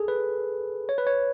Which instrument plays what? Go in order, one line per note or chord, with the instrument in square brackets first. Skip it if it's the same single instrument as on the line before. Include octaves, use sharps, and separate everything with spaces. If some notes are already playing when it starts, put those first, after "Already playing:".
Already playing: [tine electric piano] G#4 A4
B4
C#5
B4
C#5